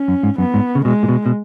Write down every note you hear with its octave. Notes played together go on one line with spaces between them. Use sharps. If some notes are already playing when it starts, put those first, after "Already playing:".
Already playing: C#4
F#2
G#2
F#2 B3
G#2
C#3
B2 G#3
A#2
B2
B2